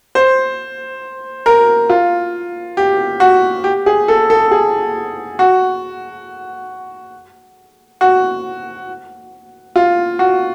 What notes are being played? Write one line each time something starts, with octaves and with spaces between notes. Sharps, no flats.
C5
A#4
F4
G4
F#4
G4
G#4
A4
A4
G#4
F#4
F#4
F4
F#4